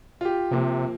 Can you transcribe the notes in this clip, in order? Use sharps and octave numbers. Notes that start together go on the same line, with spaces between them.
F4 G4
C3 F3 A#3